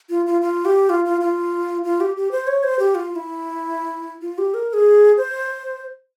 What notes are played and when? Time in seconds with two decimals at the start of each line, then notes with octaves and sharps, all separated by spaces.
0.10 F4
0.26 F4
0.41 F4
0.65 G4
0.89 F4
1.05 F4
1.21 F4
1.84 F4
2.00 G4
2.17 G4
2.31 C5
2.47 C#5
2.63 C5
2.79 G4
2.95 F4
3.12 F4
3.16 E4
4.22 F4
4.38 G4
4.54 A#4
4.70 A#4
4.73 G#4
5.17 C5